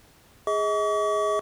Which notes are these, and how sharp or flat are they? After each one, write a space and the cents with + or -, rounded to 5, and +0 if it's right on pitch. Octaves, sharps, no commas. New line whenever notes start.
G#4 +0 D#5 +35 C#6 +45